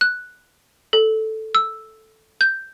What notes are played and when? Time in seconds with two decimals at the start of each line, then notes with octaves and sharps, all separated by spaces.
0.01 F#6
0.93 A4
1.55 E6
2.41 G6